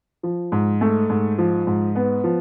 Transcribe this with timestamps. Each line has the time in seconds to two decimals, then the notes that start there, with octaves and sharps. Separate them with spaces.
0.23 F3
0.52 G#2
0.81 A3
1.09 G#2
1.38 F3
1.67 G#2
1.95 B3
2.24 F3